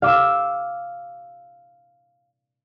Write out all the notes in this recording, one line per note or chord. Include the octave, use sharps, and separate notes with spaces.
F5 D6 E6